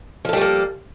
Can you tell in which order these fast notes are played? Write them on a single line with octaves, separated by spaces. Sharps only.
F3 A4 G3 A3 A#3